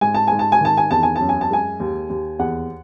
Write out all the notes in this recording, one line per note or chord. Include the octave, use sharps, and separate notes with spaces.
G#2 G#5
A5
G#2 G#5
A5
G#5
D#3 A5
G#5
E2 A5
G#5
A5
F#2
G#5
A5
G#3 G#5
D#2
D#2
E2 F#5